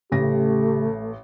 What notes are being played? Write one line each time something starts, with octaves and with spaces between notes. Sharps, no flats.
A1 C#3 A3 G4 A#6